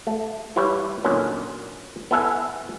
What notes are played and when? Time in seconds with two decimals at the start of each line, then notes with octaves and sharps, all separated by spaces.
0.07 A3
0.56 E3 G3 E4 G4 B4 C#5
1.04 A#2 D3 D#3 F#3 B3 C#4
2.11 B3 E4 A4 E5 F#5 G#5